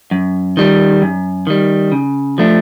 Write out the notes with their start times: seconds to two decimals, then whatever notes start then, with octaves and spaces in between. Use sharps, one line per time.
0.11 F#2
0.57 D#3 G3
1.02 F#2
1.47 D#3 G3
1.92 C#3
2.38 F3 A3 D4